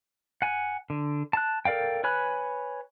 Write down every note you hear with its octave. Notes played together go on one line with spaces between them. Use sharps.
F#5 G#5
D3
A5 F#6
A4 A#4 D5 F5 G5
B4 C#5 G#5 B5 F#6